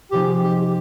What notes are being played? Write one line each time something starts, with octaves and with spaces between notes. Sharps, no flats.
C3 F3 C4 D#4 G4 G#4
G4